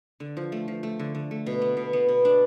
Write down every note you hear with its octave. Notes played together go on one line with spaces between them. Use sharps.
D3
F3
A3
F3
A3
D3
D3
A3
B2
B3
B2
B3
B2
D4